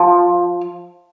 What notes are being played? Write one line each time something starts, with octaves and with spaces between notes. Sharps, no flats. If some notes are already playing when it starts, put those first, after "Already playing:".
Already playing: F3